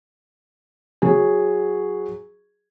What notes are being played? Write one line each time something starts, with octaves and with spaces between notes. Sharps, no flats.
F#3 G#4